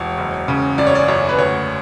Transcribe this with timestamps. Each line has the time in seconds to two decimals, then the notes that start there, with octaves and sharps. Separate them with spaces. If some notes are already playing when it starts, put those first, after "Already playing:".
Already playing: E1 C#5
0.18 F#1
0.48 C#3
0.78 F#2 D5
0.87 C#5
0.95 D5
1.08 F#2 C#5
1.29 B4
1.38 D2 C#5